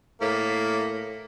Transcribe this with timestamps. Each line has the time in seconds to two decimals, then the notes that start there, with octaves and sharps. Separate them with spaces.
0.21 A2 A#3